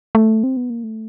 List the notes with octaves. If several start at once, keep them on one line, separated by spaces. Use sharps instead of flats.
A3
C4
B3
A#3
A3